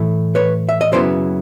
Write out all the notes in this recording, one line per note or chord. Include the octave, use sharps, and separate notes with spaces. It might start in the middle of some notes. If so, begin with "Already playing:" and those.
Already playing: A2 E3 A3
B4 C#5
E5
D#5
F#2 C#3 F#3 B3 E4 C5 D5